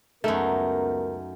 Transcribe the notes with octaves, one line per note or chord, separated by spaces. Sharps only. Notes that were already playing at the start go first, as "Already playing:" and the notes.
C#2 F#2 A3 B3 D#4 A#4